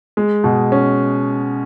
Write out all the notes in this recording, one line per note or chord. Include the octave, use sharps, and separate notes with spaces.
G#3
B2
C#4